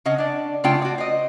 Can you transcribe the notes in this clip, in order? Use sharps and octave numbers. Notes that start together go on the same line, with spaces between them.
C#3 C#4 D#5 F#5
D4 D5
C#3 A3 D4 F4 G5
F#4 D5
C5 D#5